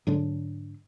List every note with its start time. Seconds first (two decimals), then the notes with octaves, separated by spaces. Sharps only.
0.07 G#2 D3 F#3 D4